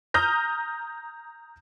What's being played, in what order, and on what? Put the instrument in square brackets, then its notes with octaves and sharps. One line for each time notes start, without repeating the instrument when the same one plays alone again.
[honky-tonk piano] A#5 D#6 F6 G6 A#6